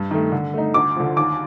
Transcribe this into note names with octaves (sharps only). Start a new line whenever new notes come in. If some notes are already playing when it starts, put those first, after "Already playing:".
Already playing: G2
D#3 A3
D3
A3 D#4
D2 D6
D3 F3
D#2 D6